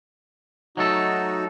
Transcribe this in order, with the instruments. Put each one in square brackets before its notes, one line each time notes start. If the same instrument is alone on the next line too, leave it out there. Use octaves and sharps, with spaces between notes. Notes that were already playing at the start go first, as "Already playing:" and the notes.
[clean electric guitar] F#3 A3 A4 [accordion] D#4 F#4